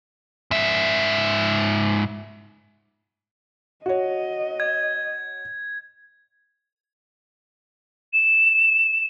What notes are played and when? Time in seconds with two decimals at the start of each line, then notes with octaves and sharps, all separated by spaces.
0.51 G#2 E5
3.86 F#4 C#5 D#5
4.60 G#6
8.13 E7